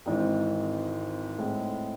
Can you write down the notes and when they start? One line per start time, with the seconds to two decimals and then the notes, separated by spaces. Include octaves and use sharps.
0.06 G#1 G#2 E3 G#3 C4
1.38 A2 G#3 C4